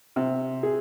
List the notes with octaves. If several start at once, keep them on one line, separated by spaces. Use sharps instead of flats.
C3
G#4